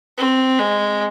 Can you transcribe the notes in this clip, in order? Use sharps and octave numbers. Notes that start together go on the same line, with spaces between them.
C4
G#3